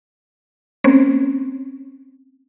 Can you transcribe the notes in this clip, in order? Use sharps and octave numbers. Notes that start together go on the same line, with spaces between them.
A#3 C4 C#4